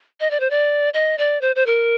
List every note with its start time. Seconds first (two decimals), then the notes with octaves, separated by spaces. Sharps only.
0.20 D#5
0.31 D5
0.40 C5
0.50 D5
0.94 D#5
1.18 D5
1.41 C5
1.56 C5
1.66 A#4